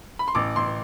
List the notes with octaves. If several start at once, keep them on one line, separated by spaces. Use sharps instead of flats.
B5
C6
A1 D6
A1 C6